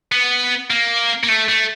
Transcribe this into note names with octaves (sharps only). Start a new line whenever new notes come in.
B3
A#3
A#3
A3
A3